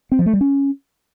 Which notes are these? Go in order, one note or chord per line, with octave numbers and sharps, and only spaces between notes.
C4
F3
A3
G3
C#4